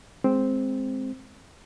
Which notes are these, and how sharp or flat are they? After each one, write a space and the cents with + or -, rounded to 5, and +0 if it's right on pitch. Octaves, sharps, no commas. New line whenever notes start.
G#3 +5 C4 +0